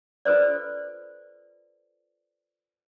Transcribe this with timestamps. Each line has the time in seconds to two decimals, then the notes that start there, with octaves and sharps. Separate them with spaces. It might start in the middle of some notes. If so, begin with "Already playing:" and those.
0.25 F4 A4 B4 C5 D5